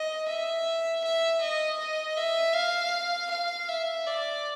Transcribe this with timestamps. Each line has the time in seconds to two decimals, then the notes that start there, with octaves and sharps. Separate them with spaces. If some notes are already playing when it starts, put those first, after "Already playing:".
Already playing: D#5
0.28 E5
1.04 E5
1.41 D#5
1.79 D#5
2.17 E5
2.55 F5
3.31 F5
3.68 E5
4.06 D5